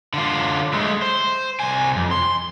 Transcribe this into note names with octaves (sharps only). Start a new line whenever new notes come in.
D3 F4
G#3 A3
C5
C2 G#5
F2
C6